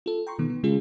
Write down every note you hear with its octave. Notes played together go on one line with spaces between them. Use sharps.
F4 A4
G5 A#5 C6 C#6
B2 D#3 B3
B3
C#3 G#3 C#4 F4 G#4